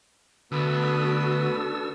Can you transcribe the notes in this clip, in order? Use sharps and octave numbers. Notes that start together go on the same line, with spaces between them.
D2 B3 D4 F#4 A4 B4 D#6 E6